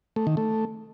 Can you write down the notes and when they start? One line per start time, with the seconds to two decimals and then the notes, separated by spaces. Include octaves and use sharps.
0.16 A3
0.27 D#3
0.37 A3